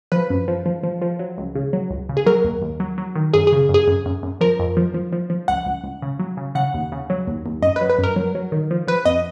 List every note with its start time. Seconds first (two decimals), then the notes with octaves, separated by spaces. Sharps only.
0.12 F3 B4
0.30 F#2
0.48 F3
0.66 F3
0.83 F3
1.02 F3
1.19 F#3
1.38 C#2
1.55 C#3
1.73 F#3
1.90 C#2
2.09 C#3
2.17 G#4
2.26 F#3 A#4
2.44 D#2
2.62 D#2
2.80 F#3
2.98 F#3
3.15 D#3
3.34 F#2 G#4
3.47 G#4
3.52 C#3
3.69 F#2
3.74 G#4
3.87 F#2
4.06 F#2
4.23 F#2
4.41 F3 A#4
4.59 F2
4.77 F3
4.94 F3
5.13 F3
5.30 F3
5.48 C#2 F#5
5.66 C#2
5.84 C#2
6.02 C#3
6.19 F#3
6.37 C#3
6.55 C#3 F#5
6.74 D#2
6.92 C#3
7.10 F#3
7.28 D#2
7.46 D#2
7.62 F#2 D#5
7.76 B4
7.81 F#3
7.90 B4
7.98 F#2
8.03 A#4
8.16 F#3
8.35 F#3
8.52 D#3
8.71 F3
8.88 F3 B4
9.05 F2 D#5